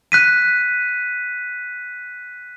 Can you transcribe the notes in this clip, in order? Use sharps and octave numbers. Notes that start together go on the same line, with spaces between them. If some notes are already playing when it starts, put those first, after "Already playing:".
F#6 B6 D#7